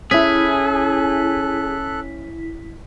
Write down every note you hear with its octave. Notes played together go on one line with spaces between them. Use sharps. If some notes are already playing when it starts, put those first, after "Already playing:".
C#4 E4 G#4 A4 F#6 B6